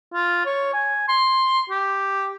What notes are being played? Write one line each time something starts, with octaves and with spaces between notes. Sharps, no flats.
F4
C#5
G#5
C6
G4